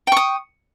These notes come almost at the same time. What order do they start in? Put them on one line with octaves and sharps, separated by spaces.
G5 C#6 D#6